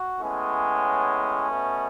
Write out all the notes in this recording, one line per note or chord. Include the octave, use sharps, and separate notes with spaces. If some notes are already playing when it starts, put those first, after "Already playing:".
Already playing: F#4
A2 G#3 B3 C#4
B2 A3